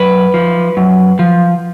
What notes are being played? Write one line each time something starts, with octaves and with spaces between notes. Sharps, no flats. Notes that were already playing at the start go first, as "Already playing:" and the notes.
Already playing: F#2 B4
F3
F#2
F3